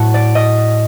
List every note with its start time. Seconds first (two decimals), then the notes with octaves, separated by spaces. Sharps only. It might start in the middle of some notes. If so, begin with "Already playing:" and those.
Already playing: A2 F#3 A3 F#5 A5
0.14 D5
0.35 D#5